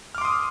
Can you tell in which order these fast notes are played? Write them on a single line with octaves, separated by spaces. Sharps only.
F6 D6 C6 D#6